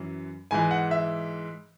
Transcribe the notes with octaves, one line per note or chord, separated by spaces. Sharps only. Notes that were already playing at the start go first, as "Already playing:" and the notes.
Already playing: F#2 E3
G#2 E3 G#5
F#5
E5